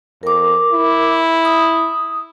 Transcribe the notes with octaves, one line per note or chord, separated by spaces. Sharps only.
F2 A#4 D6
E4
D#6